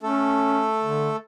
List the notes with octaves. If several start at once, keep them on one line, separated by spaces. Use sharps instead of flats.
A3 C#4 A4
D3